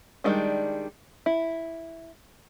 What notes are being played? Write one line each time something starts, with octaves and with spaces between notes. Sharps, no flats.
D#3 F3 G3 G#3 D4
E4